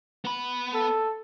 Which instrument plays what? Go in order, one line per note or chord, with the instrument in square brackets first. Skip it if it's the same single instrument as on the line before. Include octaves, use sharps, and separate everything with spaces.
[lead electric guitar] B3 B5
[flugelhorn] A4